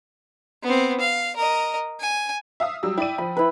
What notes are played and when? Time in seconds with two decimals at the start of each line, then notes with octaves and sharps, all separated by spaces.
0.63 B3 C4
1.00 F5
1.36 A#4 D#5
2.01 G#5
2.60 E5 F5 D#6
2.83 F#3 G3 E6
2.98 E4 D5 G5 D#7
3.18 F3 B5
3.37 E4 B4